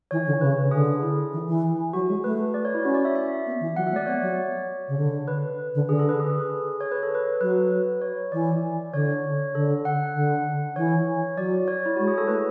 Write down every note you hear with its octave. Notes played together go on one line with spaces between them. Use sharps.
E3 C#5
D3
C#3 B4
D3 G#4
E4
E3
E3
F#3 F#4
G#3
A3 B4
D5
C#5
E4
C#4 F#4
D5
E5
E5
B3
E3
F#3 F#5
E5
A3
D5
B3 C#5
F#3
C#3
D3
B4
D3
D3 G#4
A4
B4
G#4
C#5
B4
A4
B4
F#3 B4
C#5
E3 D5
D3 C#5
D3 A4
F#5
D3
E3 C#5
F#3 D5
C#5
E4
G#3 F#4
G#4
A4
A3 B4